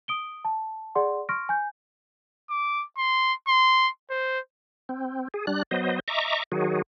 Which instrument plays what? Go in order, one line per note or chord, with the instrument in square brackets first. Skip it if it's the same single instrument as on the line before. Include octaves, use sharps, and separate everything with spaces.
[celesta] D#6 D7 G7
A5
G#4 D5 F#5 C6
C6 C#6 F6 A#6 D7
G#5 G6
[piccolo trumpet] D6
C6
C6
C5
[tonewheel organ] C4
G#4
G3 D4 F#6
F#3 B3 C5 D#5
D#5 E5 A#5 C#6 D6
D#3 F#3 F#4 G#4